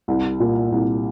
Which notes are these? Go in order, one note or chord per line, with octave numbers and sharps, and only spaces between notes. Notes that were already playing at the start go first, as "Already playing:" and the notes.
C2
A#2
C2